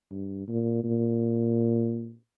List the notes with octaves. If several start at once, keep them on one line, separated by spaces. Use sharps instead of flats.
G2
A#2
A#2